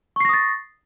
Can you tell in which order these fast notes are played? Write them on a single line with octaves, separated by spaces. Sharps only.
C#6 C7 A#6 D#6 A6